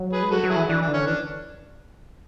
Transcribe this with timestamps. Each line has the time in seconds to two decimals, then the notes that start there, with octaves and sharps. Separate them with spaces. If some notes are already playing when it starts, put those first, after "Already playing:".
Already playing: F#3
0.12 G#4 B4
0.23 G#3
0.31 F#3 F#4 A4
0.44 F#3
0.50 E4 G#4
0.56 E3
0.69 E3 D4
0.82 D4
0.88 D3
0.94 C#4
1.06 E3 D4